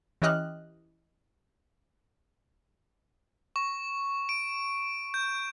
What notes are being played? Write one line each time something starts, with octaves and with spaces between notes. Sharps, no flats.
E3 C#4 G4 D#5 F6 F#6
C#6
D7
G6